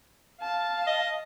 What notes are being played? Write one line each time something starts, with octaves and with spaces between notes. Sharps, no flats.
F5 A5
D#5